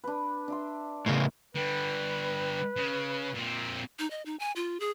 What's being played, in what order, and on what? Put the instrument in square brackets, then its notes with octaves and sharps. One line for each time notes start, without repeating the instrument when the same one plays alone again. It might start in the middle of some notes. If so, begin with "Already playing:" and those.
[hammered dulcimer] D4 B4
D4 E5 C6
[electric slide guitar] A2 C#3 [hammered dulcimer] A#4 D#5
[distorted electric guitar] D3 G3 [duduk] B4
[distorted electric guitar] C#3
A#2 C4
[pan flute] D#4
D#5
D#4
G#5
F4
G#4